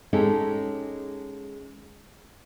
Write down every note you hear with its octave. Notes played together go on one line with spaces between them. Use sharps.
G#3 C#4 D#4 G4 A4